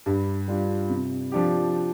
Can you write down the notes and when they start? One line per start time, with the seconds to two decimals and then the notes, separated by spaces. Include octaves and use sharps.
0.06 G2
0.48 G3 D4 F4
0.89 C3
1.32 F3 D4 G4